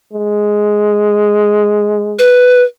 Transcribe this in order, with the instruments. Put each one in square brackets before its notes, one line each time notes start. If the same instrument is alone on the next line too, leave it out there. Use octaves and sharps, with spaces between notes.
[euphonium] G#3
[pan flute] B4